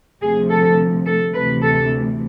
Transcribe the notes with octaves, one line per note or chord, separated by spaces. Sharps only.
D2 C3 F3 G#4
A4
A4
D2 C3 E3 B4
A4